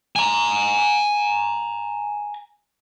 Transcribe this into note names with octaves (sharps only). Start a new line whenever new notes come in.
G#5 A#5